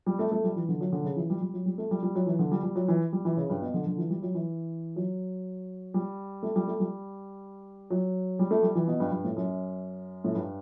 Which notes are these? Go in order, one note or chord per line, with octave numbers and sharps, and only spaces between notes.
G3
A3
A3
G3
E3
D3
F#3
D3
C#3
E3
G3
G3
F#3
G3
A3
G3
G3
F#3
E3
D3
G3
G3
F#3
E3
G3
E3
C#3
G2
B2
D3
D3
E3
G3
F#3
E3
F#3
G3
A3
G3
A3
G3
F#3
G3
A3
G3
E3
B2
G2
G2
A2
F#2
A2
G2